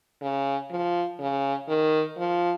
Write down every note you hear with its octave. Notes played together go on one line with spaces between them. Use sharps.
C#3
F3
C#3
D#3
F3